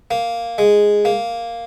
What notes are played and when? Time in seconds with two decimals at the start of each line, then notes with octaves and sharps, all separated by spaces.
0.11 A#3
0.58 G#3
1.05 A#3